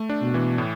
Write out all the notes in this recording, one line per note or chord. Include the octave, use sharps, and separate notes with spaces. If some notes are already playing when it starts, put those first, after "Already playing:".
Already playing: A3
D4
B2
E3
A2